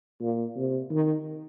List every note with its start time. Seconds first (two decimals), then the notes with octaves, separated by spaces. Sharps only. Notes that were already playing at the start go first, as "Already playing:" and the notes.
0.21 A#2
0.56 C3
0.91 D#3